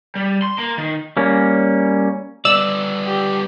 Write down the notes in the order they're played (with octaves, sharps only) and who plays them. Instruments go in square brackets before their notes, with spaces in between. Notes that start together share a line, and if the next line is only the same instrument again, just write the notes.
[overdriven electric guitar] G3
C6
A#3
D#3
[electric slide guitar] G3 A#3 C#4
[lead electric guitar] G3 B3 [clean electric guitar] D5 [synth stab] E6
[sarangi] G4